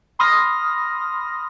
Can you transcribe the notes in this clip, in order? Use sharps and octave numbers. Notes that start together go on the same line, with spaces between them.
B5 C6 D#6 F6 A#6